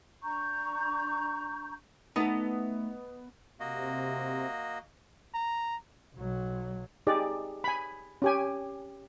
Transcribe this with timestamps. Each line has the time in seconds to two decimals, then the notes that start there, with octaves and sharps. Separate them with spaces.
0.23 D4 A#5 C#6 G6
2.16 A3 B3 D#4 A4 D#5
3.60 C3 A#3 F#4 D#5
5.34 A#5
6.16 B1 F#3
7.07 D#4 G4 G#4 D5
7.64 G#5 B5
8.22 C#4 G4 G#5